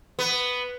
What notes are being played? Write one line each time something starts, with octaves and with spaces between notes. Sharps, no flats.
B3